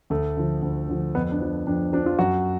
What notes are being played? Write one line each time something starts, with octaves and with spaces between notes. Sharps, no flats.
D2 A3
D3 F3
D2
D3 F3
F2 B3
D4
F3
F2 D4
F3 D4
F4
F#2 F#4